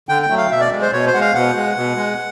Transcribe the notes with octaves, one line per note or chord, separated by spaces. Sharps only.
D3 G5
G5
F#3 A3
F5
B2 E5
D5
G#3
C5
B2 C#5
C5
G#3 F#5
F5
B2 F#5
G#3
B2
G#3